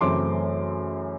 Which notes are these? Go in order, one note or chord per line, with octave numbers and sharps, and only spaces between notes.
F#2 C#3 E3 A3 C4 C6 D6